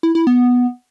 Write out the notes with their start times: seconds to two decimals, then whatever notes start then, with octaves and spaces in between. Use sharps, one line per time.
0.03 E4
0.15 E4
0.27 B3